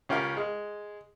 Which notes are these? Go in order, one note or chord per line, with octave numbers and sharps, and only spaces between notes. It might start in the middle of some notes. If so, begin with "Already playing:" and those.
C#2 C#4 F4 G4 A#4 F5
G#3